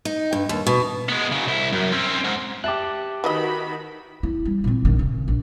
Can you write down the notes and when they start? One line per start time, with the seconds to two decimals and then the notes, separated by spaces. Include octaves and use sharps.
0.05 D#4
0.33 G2
0.49 D#2
0.67 B2
1.09 G#3 B3
1.32 C#3 F#3
1.47 C2 E4
1.72 F#2
1.92 C4 C#4
2.24 G#2
2.64 G4 E5 A5 D6 F#6
3.24 D#3 E3 F#4 B4 D#5 B5
4.23 E4
4.45 G3
4.64 A#2 C4
4.85 A#1 D#3
4.99 C#3
5.28 A#1